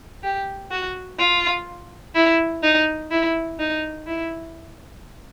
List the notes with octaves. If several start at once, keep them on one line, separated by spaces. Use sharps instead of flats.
G4
F#4
F4
E4
D#4
E4
D#4
E4